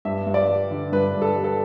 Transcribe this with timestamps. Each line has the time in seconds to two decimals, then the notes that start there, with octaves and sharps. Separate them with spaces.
0.05 G2 E5
0.27 G2
0.34 D5
0.48 G3
0.71 D3
0.92 G2 B4
1.14 G2
1.22 A4
1.36 G3
1.44 A4